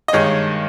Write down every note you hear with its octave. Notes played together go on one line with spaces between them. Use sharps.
D#5
G2 D#3 G#3 C#5